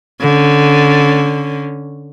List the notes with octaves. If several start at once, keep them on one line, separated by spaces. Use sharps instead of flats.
D3 C#4